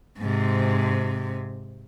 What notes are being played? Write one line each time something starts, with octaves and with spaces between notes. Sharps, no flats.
G#2 C3